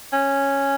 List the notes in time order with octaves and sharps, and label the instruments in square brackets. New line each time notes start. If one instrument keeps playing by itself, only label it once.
[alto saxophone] C#4